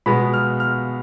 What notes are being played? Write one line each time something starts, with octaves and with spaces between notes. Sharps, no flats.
B2 G#3 B3 B5
F6
F6